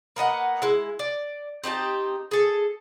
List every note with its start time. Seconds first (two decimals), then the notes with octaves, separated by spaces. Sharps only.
0.16 A#3 B3 D#5 F#5
0.62 G#3 E4
0.99 D5
1.64 C4 D#4 G4 A5
2.31 G#4 A4